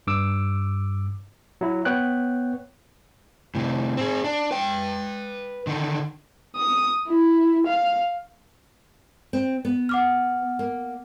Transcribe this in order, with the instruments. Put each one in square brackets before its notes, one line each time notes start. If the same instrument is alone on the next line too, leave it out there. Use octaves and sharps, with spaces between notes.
[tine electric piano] G2 D6 E6
F#3 E4
B3 C#5 G5 F#6
[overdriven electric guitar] A2 C3
C4 G#4
D4
B4 G5
D3 D#3
[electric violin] D#6
E4
F5
[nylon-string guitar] C4
B3
[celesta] F#5 D6 F6
[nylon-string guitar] A#3